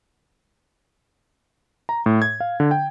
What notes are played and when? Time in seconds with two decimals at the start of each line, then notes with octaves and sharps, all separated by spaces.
1.89 A#5
2.06 A2
2.22 G#6
2.40 F5
2.60 D3
2.71 G5